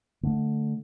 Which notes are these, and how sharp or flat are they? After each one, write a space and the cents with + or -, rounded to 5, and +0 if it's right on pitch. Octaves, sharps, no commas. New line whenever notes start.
D3 +0 A3 +0